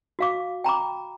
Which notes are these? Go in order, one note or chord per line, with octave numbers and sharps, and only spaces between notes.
F#4 F5 D6
G5 A#5 B5 D6